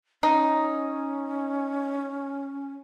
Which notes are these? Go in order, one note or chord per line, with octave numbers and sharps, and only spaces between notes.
C#4 D#4